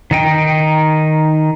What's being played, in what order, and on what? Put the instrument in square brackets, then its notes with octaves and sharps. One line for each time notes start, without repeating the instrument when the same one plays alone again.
[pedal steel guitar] D#3 D#4 G5